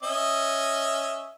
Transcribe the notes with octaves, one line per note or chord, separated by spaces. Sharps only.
C#4 D#5 E5